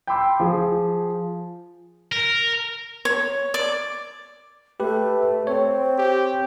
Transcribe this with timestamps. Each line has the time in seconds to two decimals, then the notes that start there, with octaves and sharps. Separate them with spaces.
0.07 G5 B5 C6 D6 E6
0.40 F3 G#4
2.12 A#4
3.05 C#5
3.54 D5
4.80 A3 G4 B4
5.47 C4 C#5
5.99 G4